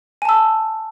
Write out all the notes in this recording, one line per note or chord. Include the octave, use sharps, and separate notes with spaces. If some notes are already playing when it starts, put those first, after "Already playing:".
G#5 A5 E6